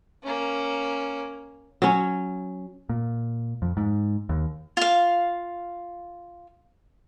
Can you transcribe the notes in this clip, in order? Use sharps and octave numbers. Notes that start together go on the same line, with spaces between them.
A#3 C#4
F#3 C#4
A#2
F2
G#2
D#2
F4 F5